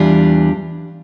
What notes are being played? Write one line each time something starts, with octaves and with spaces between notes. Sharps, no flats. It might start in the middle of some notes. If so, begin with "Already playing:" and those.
Already playing: E2 E3 G3 D4 F4